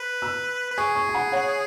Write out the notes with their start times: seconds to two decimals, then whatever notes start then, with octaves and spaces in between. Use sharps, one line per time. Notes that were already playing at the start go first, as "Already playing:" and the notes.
Already playing: B4
0.22 B5 E6
0.71 B4
0.78 G#4 G#5 C#6
0.95 G#5 C#6
1.09 G#5
1.14 F#5 B5
1.32 C#5 F#5